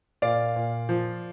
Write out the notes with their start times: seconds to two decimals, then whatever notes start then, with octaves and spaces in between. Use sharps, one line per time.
0.22 A#2 D5 F5
0.56 A#2
0.89 F3